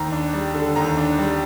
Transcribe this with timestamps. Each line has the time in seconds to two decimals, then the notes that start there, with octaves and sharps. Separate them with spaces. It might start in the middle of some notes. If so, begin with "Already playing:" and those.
Already playing: D#2 A#5
0.12 D4
0.33 G3
0.54 D3
0.76 D#2 A#5
0.97 D4
1.19 G3